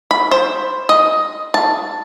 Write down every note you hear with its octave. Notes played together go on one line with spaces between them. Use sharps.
B5
C5
D#5
A5